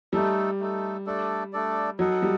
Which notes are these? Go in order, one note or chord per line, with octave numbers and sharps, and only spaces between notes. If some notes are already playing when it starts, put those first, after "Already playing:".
G3 A3 D#4 A4
A3 D#4 A4
A3 D4 A4 D5
A3 D4 A4 D5
F#3 D#4 A4 D#5 F#5
G3